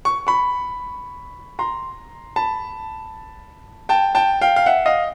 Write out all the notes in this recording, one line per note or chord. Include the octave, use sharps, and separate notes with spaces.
C#6
B5 C#6
A#5 C6
A5 B5
G5 A5
G5 A5
F5 G5
F5
E5 F#5
D#5 F5